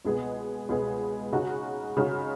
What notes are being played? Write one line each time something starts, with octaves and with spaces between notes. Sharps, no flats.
C#2 B2 G#3 B3 G#4
C#2 B2 G#3 B3 G#4
C#3 G#3 D#4 F#4
C#3 G#3 D#4 F#4